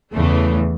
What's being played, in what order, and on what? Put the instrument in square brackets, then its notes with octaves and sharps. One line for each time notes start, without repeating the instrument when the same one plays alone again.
[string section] E2 C#3 E3 A3